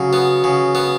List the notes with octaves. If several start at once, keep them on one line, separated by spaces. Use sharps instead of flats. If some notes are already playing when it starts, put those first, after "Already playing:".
Already playing: C#3 F#3 F#4
B3
C#3
B3